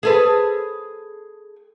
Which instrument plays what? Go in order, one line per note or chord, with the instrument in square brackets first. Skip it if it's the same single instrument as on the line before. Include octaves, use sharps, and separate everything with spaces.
[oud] G#4 A4 B4